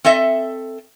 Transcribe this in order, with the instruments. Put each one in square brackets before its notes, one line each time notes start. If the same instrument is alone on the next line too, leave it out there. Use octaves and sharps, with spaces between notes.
[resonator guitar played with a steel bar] C4 A4 D#5 E5